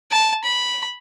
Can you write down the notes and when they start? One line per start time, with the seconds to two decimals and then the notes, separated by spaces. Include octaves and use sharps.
0.12 A5
0.44 B5